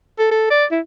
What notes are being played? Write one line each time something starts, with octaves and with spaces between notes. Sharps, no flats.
A4
A4
D5
E4